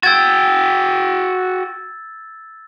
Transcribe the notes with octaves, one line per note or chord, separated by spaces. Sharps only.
F#4 G5 E6 G#6 A6